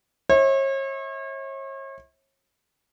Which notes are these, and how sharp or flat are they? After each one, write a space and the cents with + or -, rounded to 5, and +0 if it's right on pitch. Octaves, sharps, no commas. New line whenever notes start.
C#5 -40 E5 -35